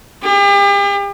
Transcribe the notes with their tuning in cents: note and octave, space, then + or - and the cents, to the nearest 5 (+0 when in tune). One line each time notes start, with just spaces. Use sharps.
G4 +40